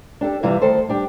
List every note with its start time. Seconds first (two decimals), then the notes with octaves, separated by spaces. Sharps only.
0.21 D4 G4 A4
0.43 G2 C3 E3 G3 F4
0.62 D2 D#3 A4 C5
0.88 G3 D4 G4